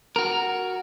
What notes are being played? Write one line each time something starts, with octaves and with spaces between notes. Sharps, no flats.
F#4 A#4